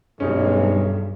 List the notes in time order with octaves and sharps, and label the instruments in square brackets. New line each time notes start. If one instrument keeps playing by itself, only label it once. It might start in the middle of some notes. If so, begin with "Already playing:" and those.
[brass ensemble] B1 [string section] G2 [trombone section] C3 G#3 A3 [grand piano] C#4 D#4